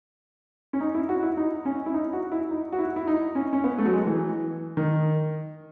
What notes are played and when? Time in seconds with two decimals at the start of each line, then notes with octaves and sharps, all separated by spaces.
0.73 C#4
0.80 D#4
0.95 E4
1.09 F#4
1.23 E4
1.37 D#4
1.65 C#4
1.86 E4
1.94 D#4
2.13 F#4
2.32 E4
2.51 D#4
2.73 F#4
2.79 E4
2.96 E4
3.07 D#4
3.35 C#4
3.53 C#4
3.64 B3
3.78 A3
3.85 F#3
3.92 G#3
4.07 E3
4.77 D#3